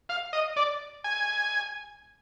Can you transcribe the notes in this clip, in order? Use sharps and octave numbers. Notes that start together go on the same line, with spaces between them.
F5
D#5
D5
G#5